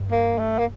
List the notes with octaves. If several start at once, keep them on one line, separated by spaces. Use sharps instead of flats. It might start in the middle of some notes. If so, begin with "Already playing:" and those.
Already playing: G2
A#3
A3
A#3